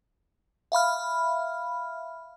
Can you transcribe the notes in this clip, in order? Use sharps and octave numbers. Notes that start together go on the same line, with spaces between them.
E5 F5 B5 F6